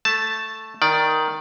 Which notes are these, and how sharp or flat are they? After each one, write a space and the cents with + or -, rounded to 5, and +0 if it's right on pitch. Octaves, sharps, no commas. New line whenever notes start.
A3 +0 A5 +0
D#3 +0 D5 +0